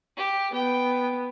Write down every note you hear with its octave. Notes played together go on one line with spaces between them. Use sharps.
G4
B3 G5